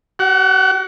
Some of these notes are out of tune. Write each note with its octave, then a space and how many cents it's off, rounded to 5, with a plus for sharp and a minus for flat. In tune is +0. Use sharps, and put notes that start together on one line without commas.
F#4 +45 F#5 -5